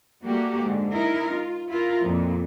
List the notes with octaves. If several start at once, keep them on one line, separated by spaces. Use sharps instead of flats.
G3 A3 A#3 F#4 G4
G#2 D3
D#4 E4 A#4
F4
E4 F4 A#4
F2 A#2